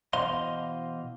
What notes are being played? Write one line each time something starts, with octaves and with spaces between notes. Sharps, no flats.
B2 E3 C5 D#5 F5 C6